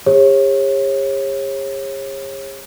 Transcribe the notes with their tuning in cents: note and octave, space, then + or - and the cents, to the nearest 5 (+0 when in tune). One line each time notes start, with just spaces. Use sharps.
G4 +45 C#5 -30